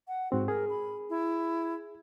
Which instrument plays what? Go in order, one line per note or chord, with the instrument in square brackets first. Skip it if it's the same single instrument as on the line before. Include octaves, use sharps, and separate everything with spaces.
[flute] F#5
[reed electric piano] G#2 C4 [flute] F#4
[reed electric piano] G#4 [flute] A#4
[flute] B5
E4